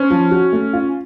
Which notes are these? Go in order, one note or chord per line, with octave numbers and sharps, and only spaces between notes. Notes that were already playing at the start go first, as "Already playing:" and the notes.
Already playing: C#4 C5
F3
F#4
A3
F4